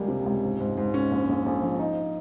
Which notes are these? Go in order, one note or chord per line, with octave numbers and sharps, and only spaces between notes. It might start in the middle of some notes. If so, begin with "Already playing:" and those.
Already playing: C#2 G3 A#3
C3
C#2
G#2
G#2
G#2
C#4
A#1
A#1
A#1
F3
D#4